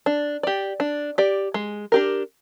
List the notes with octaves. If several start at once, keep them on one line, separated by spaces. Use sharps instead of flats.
D4
G4 D5
D4
G4 D5
G#3
D4 G4 A#4